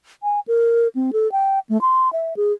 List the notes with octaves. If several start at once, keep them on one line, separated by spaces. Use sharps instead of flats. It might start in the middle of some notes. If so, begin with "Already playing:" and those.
G#5
A#4
C4
A4
G5
A3
C6
E5
G#4